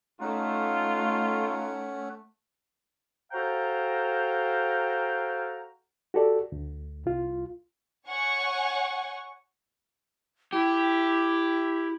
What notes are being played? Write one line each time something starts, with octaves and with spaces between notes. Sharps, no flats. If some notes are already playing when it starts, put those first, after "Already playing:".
A3 C#4 D#4 F4 F#5
F#4 A4 C5 F5 G5 A#5
F#4 G4 A4 D5
D2
C2 F4
C#5 F#5 G#5 C#6
E4 G4